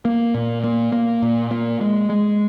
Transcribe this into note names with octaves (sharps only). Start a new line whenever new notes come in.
A#3
A#2
A#3
A#3
A#2
A#3
G#3
G#3